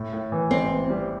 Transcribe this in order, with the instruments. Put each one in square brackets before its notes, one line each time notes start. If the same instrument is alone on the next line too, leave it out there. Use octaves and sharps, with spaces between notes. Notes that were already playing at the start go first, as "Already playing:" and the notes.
Already playing: [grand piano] A2
A2
E3
[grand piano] A1 [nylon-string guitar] C4
[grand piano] E3
G3